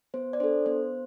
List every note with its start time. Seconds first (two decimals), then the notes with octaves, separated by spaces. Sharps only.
0.14 B3 C5
0.33 D5
0.40 D4 A4 C5
0.66 B3 C5